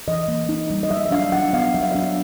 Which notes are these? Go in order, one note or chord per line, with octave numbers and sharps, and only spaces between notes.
E3 D#5
A#3
D#4
G3
D#5
F#3 E5
E5
D4 F5
F#3 F#5
B3 F5
F#3 E5
F5
D4 E5